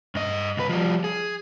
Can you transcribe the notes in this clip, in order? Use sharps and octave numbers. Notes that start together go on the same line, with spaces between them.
G2 D#5
C2 B4
F3 G3
G#4